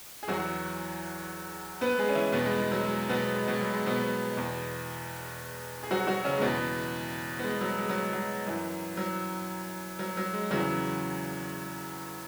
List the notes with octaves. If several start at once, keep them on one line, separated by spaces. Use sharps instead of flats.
G#4
E2 E3 F#3 F#4
B3 B4
G#3 G#4
C#4
E3 E4
E2 B2 B3
G#3
G#3
F#3
G#3
B2 B3
G#3
B2 B3
F#3
G#3
B2 B3
E2 B2
G#4
F#3 F#4
F#3 F#4
C#3 C#4
G#3
E2 B2 E3 B3
B3
G#3
F#3
G#3
F#3
F#3
F#2 E3
F#3
F#3
F#3
G#3
E2 C#3 E3 F#3